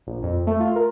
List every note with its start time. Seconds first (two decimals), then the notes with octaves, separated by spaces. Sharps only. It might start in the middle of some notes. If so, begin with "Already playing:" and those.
0.07 A#1
0.23 F2
0.47 A3
0.60 F4
0.76 A#4